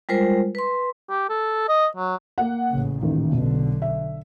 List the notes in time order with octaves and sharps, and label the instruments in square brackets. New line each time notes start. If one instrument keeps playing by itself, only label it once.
[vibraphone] G3 G#3 F4 A#4 C5
B4 C6
[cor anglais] G4
A4
D#5
F#3
[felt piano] A#3 F#5
[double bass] A1 C#3
[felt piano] D#1 A1 D#2 [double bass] D#3
[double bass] B1 D3 [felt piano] B2
[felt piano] E5